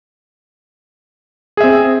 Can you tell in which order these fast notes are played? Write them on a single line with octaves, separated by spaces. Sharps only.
G#4 E5 C4